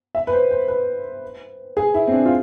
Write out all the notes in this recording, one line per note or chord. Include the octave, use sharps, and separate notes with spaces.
E5
B4
C5
C5
B4
G#4
E4
C4
D4
F4